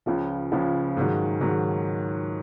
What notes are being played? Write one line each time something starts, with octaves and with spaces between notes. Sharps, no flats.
C#2 C#3 F3
C#2 C#3 F3
G#2 D#3 F#3
G#2 D#3 F#3